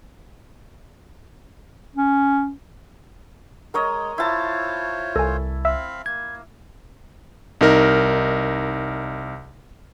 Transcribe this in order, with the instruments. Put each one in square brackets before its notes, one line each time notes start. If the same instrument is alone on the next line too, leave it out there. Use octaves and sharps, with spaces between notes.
[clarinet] C#4
[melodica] G#3 [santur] A#4 C#5 D#5
[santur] E4 A5 [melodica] F4 C5 C#5
[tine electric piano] C2 [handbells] A4 G#5
[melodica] C4 F5 B5 [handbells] E5 E6
[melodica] A#3 [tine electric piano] G#6
[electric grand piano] C2 D#4 A#4 F6